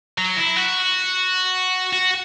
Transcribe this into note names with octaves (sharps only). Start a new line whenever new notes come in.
F#3
E4
F#4
F#4